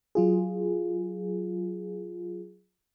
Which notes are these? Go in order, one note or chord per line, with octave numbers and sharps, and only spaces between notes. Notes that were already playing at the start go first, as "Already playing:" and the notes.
F#3 F4 G#4